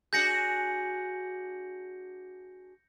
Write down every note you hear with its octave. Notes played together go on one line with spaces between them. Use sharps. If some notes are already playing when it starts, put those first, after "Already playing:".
D4 F#4 G#4 G6 A#6 C#7